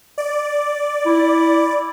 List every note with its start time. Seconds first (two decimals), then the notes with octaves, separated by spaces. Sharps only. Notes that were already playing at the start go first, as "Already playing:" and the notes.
0.18 D5
1.06 E4